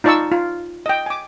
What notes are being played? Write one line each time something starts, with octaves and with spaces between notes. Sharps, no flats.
D#4 F4 D5 A5 C#6 E6
F4
D#5 G5
G#5 D6